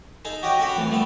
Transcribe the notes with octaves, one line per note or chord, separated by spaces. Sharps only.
D#4 G#4 A4
F#4 G4 C#5 D#5 F#5 G5
C#4 F#4 A4 F#5 G5 B5
F2 A2 E3
G3 A3 B3 A4